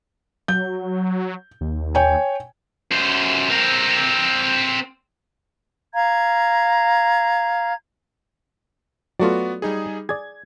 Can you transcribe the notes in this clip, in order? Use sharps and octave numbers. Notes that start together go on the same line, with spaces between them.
F#3 G6
D#2
C#5 G5 G#5
F#2 C5
C4 A#4
F5 A#5 G#6
F#3 A3 B3 F4 F#4 D5
G3 D#4 G#4
G#4 D5 G#6